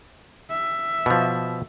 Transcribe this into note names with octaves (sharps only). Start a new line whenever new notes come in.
E5
B2 F3